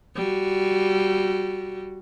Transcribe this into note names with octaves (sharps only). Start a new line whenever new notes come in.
G3 F#4